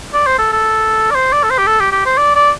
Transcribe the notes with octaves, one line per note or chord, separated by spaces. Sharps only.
D5
C5
A4
A4
D5
C5
D5
A4
C5
G4
A4
G4
G4
C5
D5
D5